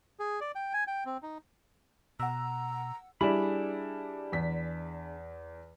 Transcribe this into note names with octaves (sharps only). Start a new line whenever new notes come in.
G#4
D5
G5
G#5
G5
C4
D#4
B2 F#5 A#5 E6
G3 D4 E4 G#4 B5
E2 B6